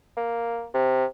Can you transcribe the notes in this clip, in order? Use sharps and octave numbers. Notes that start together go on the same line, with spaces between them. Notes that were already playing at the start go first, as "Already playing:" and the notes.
A#3
C3